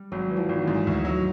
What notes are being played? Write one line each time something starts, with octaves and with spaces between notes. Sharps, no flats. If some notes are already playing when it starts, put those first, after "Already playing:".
Already playing: G3
G#1 F#3
E3
F3
G#1 D#3
E3
G#2
D2
F#3